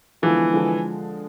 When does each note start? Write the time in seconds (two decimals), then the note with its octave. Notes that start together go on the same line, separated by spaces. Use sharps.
0.22 D3 E3 F3 G#3 B3
0.52 D3 F3 G#3